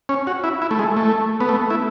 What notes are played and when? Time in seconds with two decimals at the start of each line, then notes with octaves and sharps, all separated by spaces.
0.09 C#4
0.27 F#4
0.44 E4
0.62 E4
0.71 A3
0.79 G#3
0.97 A3
1.40 B3
1.49 A3
1.70 E4